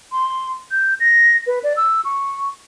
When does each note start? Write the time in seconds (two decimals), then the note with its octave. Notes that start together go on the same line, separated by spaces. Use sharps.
0.12 C6
0.71 G6
1.00 A#6
1.47 B4
1.63 D5
1.77 E6
2.05 C#6